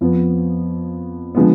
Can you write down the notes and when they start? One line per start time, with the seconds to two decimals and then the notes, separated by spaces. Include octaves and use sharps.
0.01 F2 F3 B3
1.35 D3 F3 G#3 B3